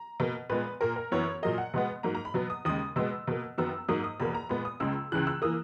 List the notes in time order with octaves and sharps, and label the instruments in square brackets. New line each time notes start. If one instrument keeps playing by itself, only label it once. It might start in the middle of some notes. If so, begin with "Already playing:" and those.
Already playing: [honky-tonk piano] A#5
B2 A#3
A#2 G#3 B3 B4
A#2 A#3 A#4
A#4
F#2 E3 B3 C#5
A#2 F#3 A#3 D#5
F#5
B2 G#3 B3
G#2 F#3 A#3 A#5
A#5
B5
B2 F#3 B3
D#6
D#2 C#3 G#3 D#6
B2 G#3 B3 E6
B2 A#3
F#2 D#3 F#3 B3 E6
G#2 F#3 A#3 D#6
D#6
E2 B2 A#3 B5
A#5
A#2 G#3 B3 B5
D#6
C#2 C#3 G#3 E6
C#2 C#3 E3 F#6
E6
E3 A#3 D#6